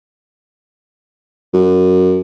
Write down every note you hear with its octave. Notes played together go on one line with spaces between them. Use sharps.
F#2